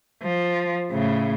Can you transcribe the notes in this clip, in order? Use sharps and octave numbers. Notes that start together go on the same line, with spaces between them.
F3
A2 C#3